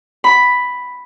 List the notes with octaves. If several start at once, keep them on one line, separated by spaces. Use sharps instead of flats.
B5